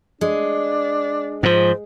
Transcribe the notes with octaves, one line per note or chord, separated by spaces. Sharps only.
G#3 D4
G#2 F3 C5